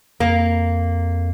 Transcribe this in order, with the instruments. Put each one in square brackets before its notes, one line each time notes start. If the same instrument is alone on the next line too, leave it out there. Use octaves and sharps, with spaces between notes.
[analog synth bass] F2 [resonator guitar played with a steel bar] A#3